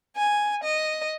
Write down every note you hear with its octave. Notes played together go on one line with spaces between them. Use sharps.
G#5
D#5